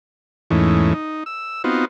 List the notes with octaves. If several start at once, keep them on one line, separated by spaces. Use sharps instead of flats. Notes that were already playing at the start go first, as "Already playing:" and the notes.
E2 G#2 E3 A3 C#4 D#4
D#4
E6
B3 C4 D#4 F4 F#4